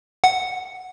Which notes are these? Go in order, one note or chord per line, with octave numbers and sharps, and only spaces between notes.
F#5